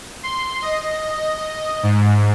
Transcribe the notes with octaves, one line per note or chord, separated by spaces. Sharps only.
C6
D#5
G#2